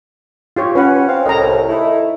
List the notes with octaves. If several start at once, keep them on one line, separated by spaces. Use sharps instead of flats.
F4 G4 C#5
C#4 B4 F#5
C4 F5
C2 A2 D#5 A#5
A3 D#4 E4